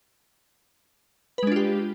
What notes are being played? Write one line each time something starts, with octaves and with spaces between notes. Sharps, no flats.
G#3 D4 F4 G4 B4